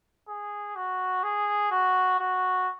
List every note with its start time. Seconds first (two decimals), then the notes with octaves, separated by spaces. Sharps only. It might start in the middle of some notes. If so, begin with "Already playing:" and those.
0.28 G#4
0.76 F#4
1.24 G#4
1.71 F#4
2.19 F#4